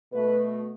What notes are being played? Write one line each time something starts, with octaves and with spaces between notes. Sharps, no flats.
B2 A3 B4